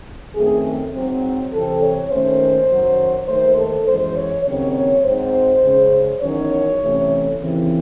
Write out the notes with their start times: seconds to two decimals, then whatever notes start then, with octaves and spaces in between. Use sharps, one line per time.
0.35 F#2 D#3 A3 C4 G#4
0.94 G#2 F#3 C4
1.52 C3 E3 C4 A4
1.82 C#5
2.11 D#2 D#3 A3 C#4 C5
2.70 F#2 D#3 F#3
3.28 D#2 D#3 A3 C5
3.57 A4
3.87 F#2 E3 G#3 C5
4.16 C#5
4.45 D#2 C#3 F#3 C4 C#5
4.75 C#5
5.04 G#2 F#3 C4 C5
5.63 C#3 G#3 C#4
6.21 E2 D#3 F#3 C#4 C#5
6.80 C3 E3 A3 C#4
7.38 D#2 C#3 E3 C4